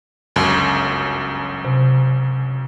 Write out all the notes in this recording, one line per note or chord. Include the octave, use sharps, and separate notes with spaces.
G1 C#2 F#2
C3